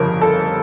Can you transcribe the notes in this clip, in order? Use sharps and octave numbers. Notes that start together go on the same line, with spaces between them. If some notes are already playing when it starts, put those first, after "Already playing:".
Already playing: G1 F2 C#3 A#4
A4